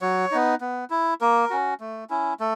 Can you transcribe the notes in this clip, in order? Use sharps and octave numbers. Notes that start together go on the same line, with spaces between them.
F#3 C#5
B3 D#4
B3
E4
A#3 A#4
C#4 F#4
A3
C#4 E4
A3 A4